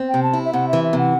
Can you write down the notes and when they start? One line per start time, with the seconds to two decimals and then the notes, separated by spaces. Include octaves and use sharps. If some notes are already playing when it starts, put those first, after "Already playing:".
Already playing: C4
0.09 G5
0.14 C3
0.23 A5
0.33 E4
0.45 E5
0.53 C3 F#5
0.68 E3 E5
0.84 E5
0.93 C3
0.98 F#5